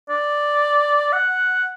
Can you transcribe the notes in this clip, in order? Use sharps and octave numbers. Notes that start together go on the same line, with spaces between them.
D5
F#5